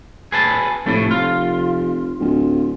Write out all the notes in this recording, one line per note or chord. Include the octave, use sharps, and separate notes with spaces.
G#4 B4 A5
F1 A2 A3
F4
D1